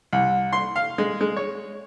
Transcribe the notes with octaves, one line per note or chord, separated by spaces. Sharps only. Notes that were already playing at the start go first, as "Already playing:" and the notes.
C2
C6
F5
G#3
G#3
C#5